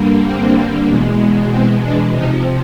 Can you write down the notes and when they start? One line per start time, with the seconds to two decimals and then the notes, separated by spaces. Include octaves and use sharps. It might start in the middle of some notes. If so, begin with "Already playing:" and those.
Already playing: G2 D3 G3 A#3
0.24 C4
0.88 E2 B2 G#3
1.51 C4
1.82 D4
2.14 F2 C3 F3 D#4